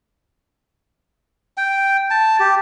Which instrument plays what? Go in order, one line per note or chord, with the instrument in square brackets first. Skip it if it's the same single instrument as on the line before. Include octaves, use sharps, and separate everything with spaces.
[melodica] G5
A5
G4